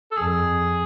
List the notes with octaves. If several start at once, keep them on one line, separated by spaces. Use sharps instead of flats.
A4
F2 G#4